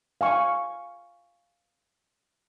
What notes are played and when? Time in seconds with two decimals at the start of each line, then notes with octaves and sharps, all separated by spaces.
0.21 F5 G#5 C#6